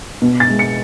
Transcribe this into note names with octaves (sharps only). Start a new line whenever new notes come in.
B2
A6
G#3
C#7